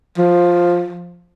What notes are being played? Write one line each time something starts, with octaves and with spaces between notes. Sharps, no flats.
F3